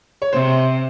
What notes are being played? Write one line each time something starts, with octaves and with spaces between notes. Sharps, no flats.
C#5
C3 C5